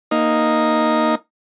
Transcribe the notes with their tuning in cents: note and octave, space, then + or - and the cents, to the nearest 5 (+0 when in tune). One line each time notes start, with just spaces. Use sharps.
A#3 +0 D#4 +0